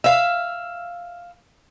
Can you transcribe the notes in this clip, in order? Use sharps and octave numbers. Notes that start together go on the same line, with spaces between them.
E5 F5